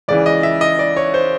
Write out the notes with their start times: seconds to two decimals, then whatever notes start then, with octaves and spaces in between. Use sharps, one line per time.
0.08 C#2 C#3 E3 D5
0.26 D#5
0.43 E5
0.61 D#5
0.79 D5
0.97 C#5
1.14 C5